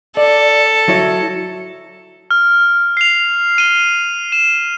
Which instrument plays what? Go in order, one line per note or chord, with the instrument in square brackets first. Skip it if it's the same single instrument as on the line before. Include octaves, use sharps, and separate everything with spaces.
[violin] A4 [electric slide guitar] D5
[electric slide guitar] F#3 E4 C#5
[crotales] F6
C7 F7
D#7 G7
E7